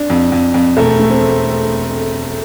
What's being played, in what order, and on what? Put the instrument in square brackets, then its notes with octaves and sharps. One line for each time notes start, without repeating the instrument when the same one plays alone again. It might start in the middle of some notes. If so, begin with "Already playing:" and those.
Already playing: [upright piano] D4
F2
F2
F2
[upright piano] E1 [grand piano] A3
[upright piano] A3
[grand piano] C4